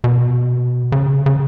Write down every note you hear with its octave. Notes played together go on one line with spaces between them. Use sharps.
B2
C#3
C#3